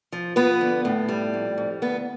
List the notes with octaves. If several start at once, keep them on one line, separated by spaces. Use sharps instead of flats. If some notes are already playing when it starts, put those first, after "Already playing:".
F3
F3 B3 B4
D3
A2
G3
F2
F2
D2 B3 B4